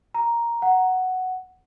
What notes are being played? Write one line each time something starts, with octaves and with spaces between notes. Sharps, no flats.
A#5
F#5